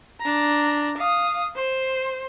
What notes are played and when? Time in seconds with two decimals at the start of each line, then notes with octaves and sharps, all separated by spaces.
0.21 D4 A#5
0.97 F5 D#6
1.56 C5